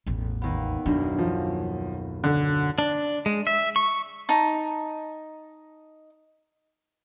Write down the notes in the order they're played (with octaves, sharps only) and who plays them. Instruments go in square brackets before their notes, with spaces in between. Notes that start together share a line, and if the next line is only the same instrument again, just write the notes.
[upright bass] A1 E2
[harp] D#2 B3
[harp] B1 F#2 [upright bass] D4
[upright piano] F3
D3
[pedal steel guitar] D4
G#3
E5
C#6
[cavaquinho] D#4 A5